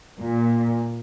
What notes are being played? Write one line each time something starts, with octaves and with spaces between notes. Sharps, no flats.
A#2